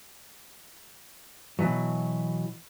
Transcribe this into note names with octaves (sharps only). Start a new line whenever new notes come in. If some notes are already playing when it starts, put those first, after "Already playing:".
B2 E3 F#3